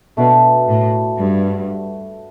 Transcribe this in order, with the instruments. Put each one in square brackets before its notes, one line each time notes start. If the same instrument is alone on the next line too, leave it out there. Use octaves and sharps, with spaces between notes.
[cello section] B2 [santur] A3 D4 F#4 B4
[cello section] A2
G2